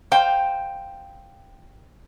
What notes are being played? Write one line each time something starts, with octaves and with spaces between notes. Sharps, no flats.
C5 F5 G5